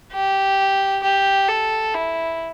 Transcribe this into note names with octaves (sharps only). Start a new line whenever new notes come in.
G4
G4
A4
E4